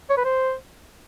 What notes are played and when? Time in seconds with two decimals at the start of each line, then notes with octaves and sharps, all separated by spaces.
0.10 C#5
0.17 B4
0.25 C5